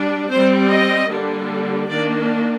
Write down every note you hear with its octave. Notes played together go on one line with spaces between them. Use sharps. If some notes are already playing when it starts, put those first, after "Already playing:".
Already playing: G3 D4
G3 C4 C5
D#5
D3 G3 A#3 D4
D#3 A#3 D4 D5